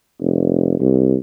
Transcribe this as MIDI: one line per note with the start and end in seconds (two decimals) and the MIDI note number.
0.21 0.80 29
0.80 1.15 36